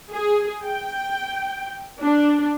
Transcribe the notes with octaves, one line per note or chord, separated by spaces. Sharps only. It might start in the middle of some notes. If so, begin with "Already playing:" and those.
G#4
G5
D4